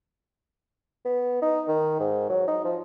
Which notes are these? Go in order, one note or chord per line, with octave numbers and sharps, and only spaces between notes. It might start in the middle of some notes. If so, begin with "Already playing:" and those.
B3
D#4
D#3
G#2
F#3
D#4
F3